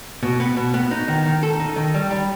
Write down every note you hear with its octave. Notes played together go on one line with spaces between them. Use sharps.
B2
B3
B2
B3
D#4
D#3
D#3
A4
D#4
D#3
G3
G3